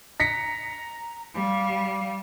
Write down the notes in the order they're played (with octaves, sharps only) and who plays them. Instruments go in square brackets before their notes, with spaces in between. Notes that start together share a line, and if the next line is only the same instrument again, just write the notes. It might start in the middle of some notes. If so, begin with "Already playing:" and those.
[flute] A#5 [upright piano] A#6 B6 C#7
[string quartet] G3 [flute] F5